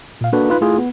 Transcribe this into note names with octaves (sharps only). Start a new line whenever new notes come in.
A#2 F5
A#3 D4 F#4 A4 B4
D#4 F4 B4
A3 E4 F4 G#4
B3